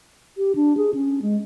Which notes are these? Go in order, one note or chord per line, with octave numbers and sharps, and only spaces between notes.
G4
D4
G#4
C#4
G#3